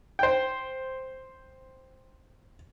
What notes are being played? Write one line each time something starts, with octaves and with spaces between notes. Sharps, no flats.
C5 G5